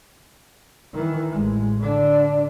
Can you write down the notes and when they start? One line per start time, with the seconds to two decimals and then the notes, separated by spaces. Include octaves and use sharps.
0.94 D#3 E3
1.31 A1 G#3
1.80 D3 D4